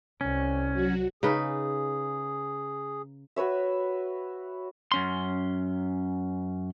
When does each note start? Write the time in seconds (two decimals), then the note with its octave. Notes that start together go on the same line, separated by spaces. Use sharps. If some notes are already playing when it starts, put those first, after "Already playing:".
0.21 C2 C#4
0.73 F#3 F#4
1.23 C#3 D#4 G#4 B4
3.36 F#4 B4 C#5 E5
4.92 F#2 C#4 C6